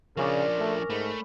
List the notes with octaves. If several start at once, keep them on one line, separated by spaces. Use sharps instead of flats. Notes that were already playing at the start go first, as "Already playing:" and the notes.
C#3 F3 C#4 D4 A#4 D5
A3
G#2 A3 B5